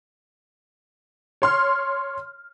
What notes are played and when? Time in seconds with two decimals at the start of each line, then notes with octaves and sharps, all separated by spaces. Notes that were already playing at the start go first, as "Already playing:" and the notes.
1.42 C#5 C6 F6